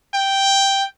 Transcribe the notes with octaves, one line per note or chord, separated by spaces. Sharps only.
G5